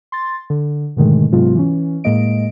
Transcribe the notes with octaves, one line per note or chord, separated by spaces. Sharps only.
C6 A6
D3
G#2 B2 D3 D#3 G#3 A3
G#2 C3 F#3 G#3 B3 F4
E3 C#4
A2 G#3 A#3 D#5 D7